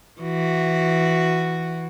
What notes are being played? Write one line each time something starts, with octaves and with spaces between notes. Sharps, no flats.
E3 F#4